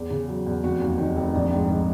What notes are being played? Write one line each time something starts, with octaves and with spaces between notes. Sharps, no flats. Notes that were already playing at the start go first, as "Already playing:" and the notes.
Already playing: E2 G4
C#3
F#3
E2
F1 F#4
D#2
D#3
F1
A#1
G#2
D#3